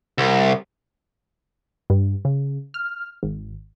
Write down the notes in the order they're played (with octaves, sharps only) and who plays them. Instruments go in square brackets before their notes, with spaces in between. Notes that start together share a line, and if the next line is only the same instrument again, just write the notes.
[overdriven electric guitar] C2
[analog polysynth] G2
C#3
F6
G#1